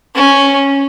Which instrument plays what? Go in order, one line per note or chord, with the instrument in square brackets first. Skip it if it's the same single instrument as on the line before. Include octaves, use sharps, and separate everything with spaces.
[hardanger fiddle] C#4